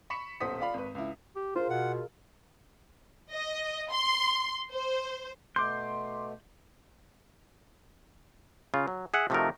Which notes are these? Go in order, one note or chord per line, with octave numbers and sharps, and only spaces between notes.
B5 C#6 B6 C#7 E7
D#1 B1 C5 F#5 D#6 B6
F4 D5 F5 B5
G#1 B4
C#2 E4
G4
F4 G#4 A#4 C5 F5
B2 F#5
D#5
C6
C5
B2 A3 C6 D6 G6
C#3 F4
F#3
G#4 E5 F#5
C3 F3 A3 D#4 F#4 A#4